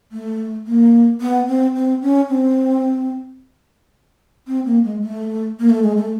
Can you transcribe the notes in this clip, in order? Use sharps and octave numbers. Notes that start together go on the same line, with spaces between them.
A3
A#3
B3
C4
C4
C#4
C4
C4
A#3
G#3
A3
A#3
A3
G#3
A3